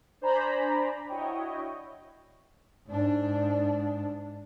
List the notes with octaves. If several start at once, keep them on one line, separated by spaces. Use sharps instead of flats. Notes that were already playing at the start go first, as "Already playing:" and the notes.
D4 C5 D5 G#5 A#5 B5
D4 E4 F#4 C#5 D#5 G5
G#2 D4